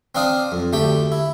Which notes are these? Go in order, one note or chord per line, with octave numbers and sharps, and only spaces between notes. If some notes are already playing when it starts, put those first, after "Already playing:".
C4 D4 D5 F5 D#6
F2
D2 A3 G4 G5
E4